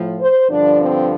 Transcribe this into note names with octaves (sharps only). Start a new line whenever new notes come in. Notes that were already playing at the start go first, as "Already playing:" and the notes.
Already playing: A2 F3
C5
G2 D3 F3 D4
C4